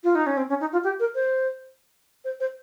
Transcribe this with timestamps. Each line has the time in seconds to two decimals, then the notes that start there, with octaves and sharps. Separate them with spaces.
0.04 F4
0.15 D#4
0.27 C#4
0.37 C4
0.49 C#4
0.60 D#4
0.73 F4
0.84 G4
1.00 A#4
1.15 C5
2.25 C5
2.40 C5